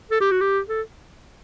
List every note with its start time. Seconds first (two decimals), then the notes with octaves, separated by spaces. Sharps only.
0.11 A4
0.21 G4
0.31 F#4
0.41 G4
0.68 A4